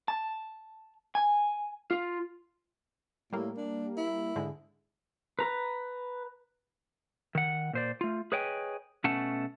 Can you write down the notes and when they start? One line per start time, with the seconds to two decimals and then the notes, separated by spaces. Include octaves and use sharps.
0.08 A5
1.15 G#5
1.91 F4
3.33 A2 G3 A#3
3.57 D4
3.97 E4
4.36 G#2 D3 G#3
5.39 B4 A#5
7.35 D#3 F#5
7.73 A#2 C5 D5
8.01 A3 F4
8.32 G#4 B4 C#5 D#5 G5 G#5
9.04 B2 A3 C#4 F#5 A5